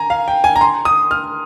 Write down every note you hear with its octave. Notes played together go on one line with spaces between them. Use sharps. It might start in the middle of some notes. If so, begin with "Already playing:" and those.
Already playing: G#5 A#5
F5
G5
G#5
A#5
C6
D#6
F6